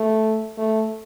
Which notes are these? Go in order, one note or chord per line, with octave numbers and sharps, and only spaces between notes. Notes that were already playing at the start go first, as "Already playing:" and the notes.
Already playing: A3
A3